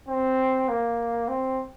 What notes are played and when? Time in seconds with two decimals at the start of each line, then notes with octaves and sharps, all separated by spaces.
0.08 C4
0.69 A#3
1.28 C4